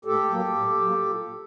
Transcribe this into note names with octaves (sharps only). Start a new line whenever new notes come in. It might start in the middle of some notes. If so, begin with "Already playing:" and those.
A2 G4 A4
F#3 A#3
A2
F#3 A#3
A#2